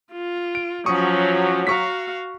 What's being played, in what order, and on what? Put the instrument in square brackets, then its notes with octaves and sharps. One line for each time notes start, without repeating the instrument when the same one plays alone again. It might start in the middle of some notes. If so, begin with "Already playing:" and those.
[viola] F4
[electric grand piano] D7
[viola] F3 C#4 [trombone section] F#3 [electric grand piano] C#6 D#6
[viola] F#4 F5 [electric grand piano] A#5 C#6 B6